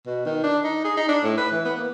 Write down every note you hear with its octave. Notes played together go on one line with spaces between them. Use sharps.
B2
D#3
D4
D#4
G#4
D#4
D4
A2
B4
E3
B3
A#3